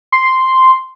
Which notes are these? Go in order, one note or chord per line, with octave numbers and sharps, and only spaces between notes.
C6